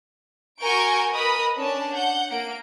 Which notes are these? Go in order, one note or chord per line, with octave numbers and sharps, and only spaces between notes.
F#4 A#4 G#5 C#6 G6 D7
A#4 B4 D#5 B5 D#6
C#4 D4 A5
F#5 G6
A#3 D7